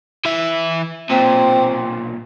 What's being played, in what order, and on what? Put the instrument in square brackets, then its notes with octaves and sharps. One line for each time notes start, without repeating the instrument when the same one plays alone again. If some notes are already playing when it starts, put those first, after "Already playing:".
[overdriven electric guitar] E3 E5
[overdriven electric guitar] B1 A#2 [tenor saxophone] C4